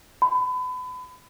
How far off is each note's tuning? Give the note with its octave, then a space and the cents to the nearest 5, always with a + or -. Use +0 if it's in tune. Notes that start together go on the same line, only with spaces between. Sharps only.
B5 +30